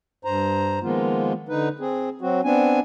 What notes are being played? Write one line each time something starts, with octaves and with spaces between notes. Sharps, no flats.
G2 C5 A#5
D#3 F3 G#3 A#3 B3 F4
D3 D#4 B4
C4 G#4
F#3 C4 F#4
B3 C4 D4 G#5